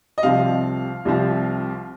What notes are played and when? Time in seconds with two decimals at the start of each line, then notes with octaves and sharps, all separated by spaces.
0.18 D#5
0.23 C2 C3 F3 C4 F4 F5
1.05 C2 C3 F3 C4 F4